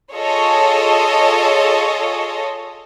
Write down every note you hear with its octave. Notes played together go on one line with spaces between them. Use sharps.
F4 G#4 A4 C#5 D#5